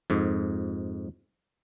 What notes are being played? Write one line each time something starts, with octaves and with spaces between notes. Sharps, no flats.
F2 G#2